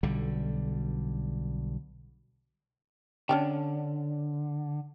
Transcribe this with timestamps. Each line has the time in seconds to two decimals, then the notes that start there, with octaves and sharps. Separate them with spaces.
0.03 B1 D3 G3
3.29 D3 C#4 D4 G5